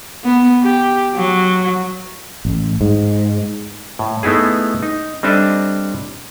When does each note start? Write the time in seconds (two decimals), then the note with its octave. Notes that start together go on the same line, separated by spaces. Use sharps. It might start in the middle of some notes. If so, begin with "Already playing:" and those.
0.24 B3
0.63 G4
1.16 F#3
2.45 A1
2.81 G#2
3.99 A2
4.23 A3 B3 D#4 E4 G#4
4.83 D#4
5.23 G3 C4 D4 A4 D#5 E5